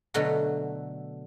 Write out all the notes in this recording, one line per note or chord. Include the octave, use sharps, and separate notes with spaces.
B2 D3 F#3 A3 F#4